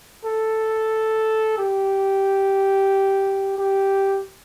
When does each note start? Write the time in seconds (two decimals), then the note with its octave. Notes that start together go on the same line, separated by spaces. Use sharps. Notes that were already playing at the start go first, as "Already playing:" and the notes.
0.25 A4
1.58 G4
3.58 G4